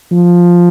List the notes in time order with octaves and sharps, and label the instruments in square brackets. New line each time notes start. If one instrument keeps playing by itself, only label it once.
[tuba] F3